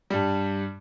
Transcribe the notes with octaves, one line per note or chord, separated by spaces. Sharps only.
G2 G3